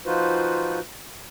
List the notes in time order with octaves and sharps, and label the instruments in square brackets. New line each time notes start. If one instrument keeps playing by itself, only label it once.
[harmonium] F3 D#4 F4 F#4 B4 C5